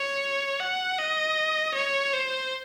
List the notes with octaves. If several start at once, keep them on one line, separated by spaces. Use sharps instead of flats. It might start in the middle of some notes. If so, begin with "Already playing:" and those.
Already playing: C#5
F#5
D#5
C#5
C5